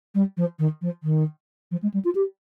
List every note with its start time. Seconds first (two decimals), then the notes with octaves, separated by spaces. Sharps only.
0.15 G3
0.37 F3
0.59 D#3
0.82 F3
1.03 D#3
1.71 F3
1.83 G#3
1.94 G3
2.05 F4
2.15 G4